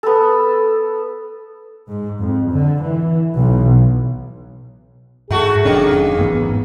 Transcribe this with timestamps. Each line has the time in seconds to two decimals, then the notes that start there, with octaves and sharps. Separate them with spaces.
0.03 B3 A4
1.89 G#2
2.21 F2
2.52 D3
2.83 E3
3.36 B1
5.31 G#2 A3 F#4 G#4
5.64 F1 D#3 F#3 A#3 C#4 D4
6.18 A1 G#2 B3